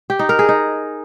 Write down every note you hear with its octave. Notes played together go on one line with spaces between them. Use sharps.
G4
D#4
A#4
G#4
D#4